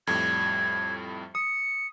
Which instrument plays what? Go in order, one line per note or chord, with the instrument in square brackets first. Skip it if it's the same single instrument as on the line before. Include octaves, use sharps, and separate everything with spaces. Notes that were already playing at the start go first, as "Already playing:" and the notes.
[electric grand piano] F2 A2 G3 [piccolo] G#6
[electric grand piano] D#6 [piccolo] C#7